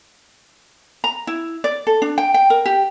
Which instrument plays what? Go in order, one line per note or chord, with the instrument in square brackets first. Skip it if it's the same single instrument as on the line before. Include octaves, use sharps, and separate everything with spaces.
[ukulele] A#5
E4
D5
A4
D4
G5
G5
A#4
G4